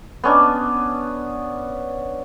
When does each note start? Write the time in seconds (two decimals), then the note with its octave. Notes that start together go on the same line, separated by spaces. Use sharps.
0.24 B3 C#4 D4